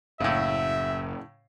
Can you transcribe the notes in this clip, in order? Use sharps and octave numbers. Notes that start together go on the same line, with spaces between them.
F#1 A2 C#3 E5